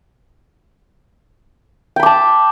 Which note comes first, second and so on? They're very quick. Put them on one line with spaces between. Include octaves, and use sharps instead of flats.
G5 B5 D6 A5